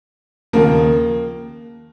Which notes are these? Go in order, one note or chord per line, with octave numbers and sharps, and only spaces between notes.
D#2 C#3 F3 A#3